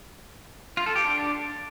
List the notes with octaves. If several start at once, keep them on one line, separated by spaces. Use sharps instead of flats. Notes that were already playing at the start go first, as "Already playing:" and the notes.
F4
A4
G4
D4